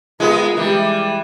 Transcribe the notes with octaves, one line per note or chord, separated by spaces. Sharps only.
G#3 B3 F4 A#4
E3 G3 G#3